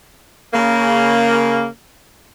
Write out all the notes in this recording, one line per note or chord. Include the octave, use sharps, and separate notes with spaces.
C#3 A#3